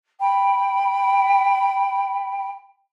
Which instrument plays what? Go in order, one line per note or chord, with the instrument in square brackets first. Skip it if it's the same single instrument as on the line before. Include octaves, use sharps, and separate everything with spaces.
[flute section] G5 B5